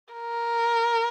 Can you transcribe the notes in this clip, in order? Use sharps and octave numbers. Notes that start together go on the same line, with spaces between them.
A#4